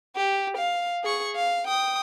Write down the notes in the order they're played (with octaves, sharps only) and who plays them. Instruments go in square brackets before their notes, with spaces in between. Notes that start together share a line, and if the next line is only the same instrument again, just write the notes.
[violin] G4
F5
G#4 C#6
F5
G5 D#6